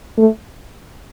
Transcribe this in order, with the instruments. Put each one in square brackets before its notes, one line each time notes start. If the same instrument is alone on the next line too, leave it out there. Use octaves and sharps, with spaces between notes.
[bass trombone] A3